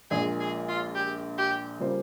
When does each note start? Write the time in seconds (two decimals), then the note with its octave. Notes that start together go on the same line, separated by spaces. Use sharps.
0.11 A#1 A#2 G#3 G#4
0.40 G#4
0.68 F4
0.95 G4
1.38 G4
1.80 C#3 G3 A#3 F4 C5